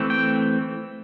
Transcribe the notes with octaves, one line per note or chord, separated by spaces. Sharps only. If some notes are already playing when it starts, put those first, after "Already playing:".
Already playing: E3 A3 C4
G5